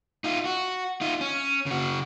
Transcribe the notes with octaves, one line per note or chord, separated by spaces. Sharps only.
D#4 F4
F#4
D#4 F4
C#4
C#3 F#4